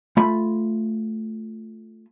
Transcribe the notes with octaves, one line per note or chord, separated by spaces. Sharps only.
A3 F4 B5